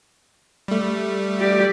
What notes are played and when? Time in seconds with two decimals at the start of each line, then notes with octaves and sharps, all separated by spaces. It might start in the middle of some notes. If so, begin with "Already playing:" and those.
0.68 G3 A3
1.39 G4 D5